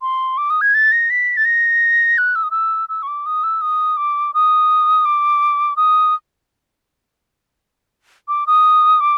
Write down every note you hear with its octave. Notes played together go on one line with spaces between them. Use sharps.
C6
D6
D#6
G#6
A6
A#6
B6
A6
A#6
F#6
E6
D#6
E6
E6
C#6
D6
D#6
E6
D#6
D6
D#6
D6
D#6
D6
D#6
D6